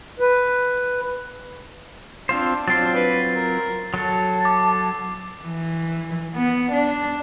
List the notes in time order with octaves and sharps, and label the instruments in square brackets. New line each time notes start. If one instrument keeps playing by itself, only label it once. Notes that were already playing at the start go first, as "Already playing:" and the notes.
[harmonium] B4
[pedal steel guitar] C4 F4 C5 [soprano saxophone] D4
[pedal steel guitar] F#3 C4 F4 [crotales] A6 C7
[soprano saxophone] B4
A#4
[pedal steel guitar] F#3 A4 [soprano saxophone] A5
[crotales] D6
[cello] E3
B3
D4